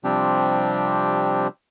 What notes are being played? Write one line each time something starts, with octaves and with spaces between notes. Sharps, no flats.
C3 F3 G3 C4 D4 G4